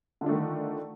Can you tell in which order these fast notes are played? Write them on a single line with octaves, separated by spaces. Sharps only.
D3 F4 D4 A3 D#3